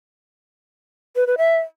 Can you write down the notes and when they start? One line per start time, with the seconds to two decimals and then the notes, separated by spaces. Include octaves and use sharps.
1.16 B4
1.27 B4
1.38 E5